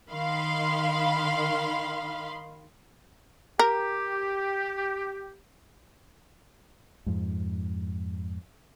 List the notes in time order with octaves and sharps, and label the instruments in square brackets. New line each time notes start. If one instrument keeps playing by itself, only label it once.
[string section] D#3 F5 B5 C6
[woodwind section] G4 [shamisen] A#4
[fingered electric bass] F2 G#2